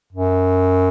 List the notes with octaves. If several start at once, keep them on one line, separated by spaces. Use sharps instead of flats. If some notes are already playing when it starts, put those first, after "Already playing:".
F#2